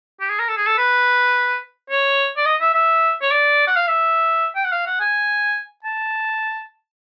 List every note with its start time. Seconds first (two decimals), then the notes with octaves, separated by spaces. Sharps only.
0.21 G4
0.30 G#4
0.39 A#4
0.49 A4
0.57 G#4
0.66 A4
0.78 B4
1.90 C#5
2.37 D5
2.46 D#5
2.61 E5
2.74 E5
3.22 C#5
3.31 D5
3.67 F#5
3.77 F5
3.88 E5
4.56 G5
4.64 F#5
4.72 F5
4.86 F#5
5.00 G#5
5.84 A5